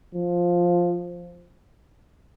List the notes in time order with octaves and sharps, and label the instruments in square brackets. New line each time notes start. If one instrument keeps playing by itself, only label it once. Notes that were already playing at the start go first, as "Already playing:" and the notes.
[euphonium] F3